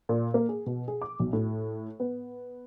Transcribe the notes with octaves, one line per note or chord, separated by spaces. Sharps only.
A#2
A#3
G#4
B2
G#4
D6
B1
A2
B3